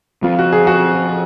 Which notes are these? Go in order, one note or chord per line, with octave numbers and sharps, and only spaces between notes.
F3 C4 F4
F#4
G#4
F#4